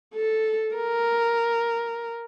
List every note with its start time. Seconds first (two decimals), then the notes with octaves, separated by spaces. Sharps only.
0.14 A4
0.75 A#4